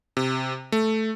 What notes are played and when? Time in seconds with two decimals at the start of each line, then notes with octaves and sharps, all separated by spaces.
0.17 C3
0.72 A3